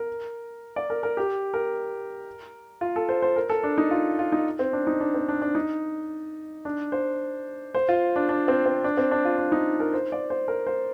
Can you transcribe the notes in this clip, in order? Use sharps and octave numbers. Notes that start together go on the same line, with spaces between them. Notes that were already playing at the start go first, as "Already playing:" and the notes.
Already playing: A#4
D5
A#4
A#4
G4
A#4
F4
A4
C5
C5
A#4
A4
D4
D#4
F4
F4
D#4
C4
D4
D#4
D4
C4
D4
D4
D#4
D4
C5
C5
F4
D4
D4
C4
C4
D4
C4
D4
F4
D4
D#4
A#4
C5
D5
C5
A#4
C5